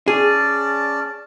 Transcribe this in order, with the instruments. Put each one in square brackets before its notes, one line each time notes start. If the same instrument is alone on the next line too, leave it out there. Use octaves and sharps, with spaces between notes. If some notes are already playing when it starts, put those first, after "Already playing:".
[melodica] C#4 D5 A5 [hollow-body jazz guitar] G#4